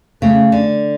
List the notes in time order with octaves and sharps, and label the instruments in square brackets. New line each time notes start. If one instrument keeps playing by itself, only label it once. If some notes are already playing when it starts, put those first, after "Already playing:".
[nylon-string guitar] C#3 [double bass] A3
[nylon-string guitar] D3